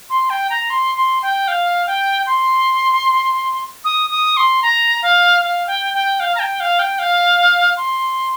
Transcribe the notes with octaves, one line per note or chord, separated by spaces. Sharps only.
C6
G5
A#5
C6
C6
G5
F5
G5
C6
D#6
D#6
C6
A#5
F5
F5
G5
G5
F5
A#5
G5
F5
G5
F5
C6